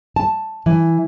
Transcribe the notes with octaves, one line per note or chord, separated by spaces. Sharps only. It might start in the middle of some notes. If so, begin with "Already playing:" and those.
A5
E3